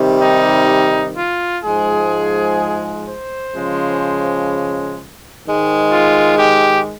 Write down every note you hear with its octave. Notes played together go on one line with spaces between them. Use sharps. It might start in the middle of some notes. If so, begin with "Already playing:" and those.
Already playing: C3 D#3 G3
D#4
F4
G#2 F3 G#3 G#4
C5
C#3 F3 G#3
G#2 D#3 G#3
F4
G4